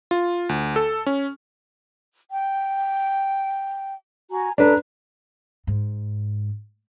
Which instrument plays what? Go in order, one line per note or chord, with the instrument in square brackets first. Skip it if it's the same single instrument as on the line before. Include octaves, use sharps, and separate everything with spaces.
[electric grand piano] F4
D2
A4
C#4
[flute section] G5
F#4 G#5 A#5
[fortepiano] D4 B4 [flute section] A4 A#5 F#6
[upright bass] G#2